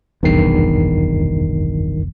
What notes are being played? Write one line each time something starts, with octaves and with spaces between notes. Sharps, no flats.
F1 B1 E2 G2 D#3 C7